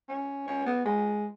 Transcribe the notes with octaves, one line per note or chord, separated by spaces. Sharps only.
C#4
C#4
B3
G#3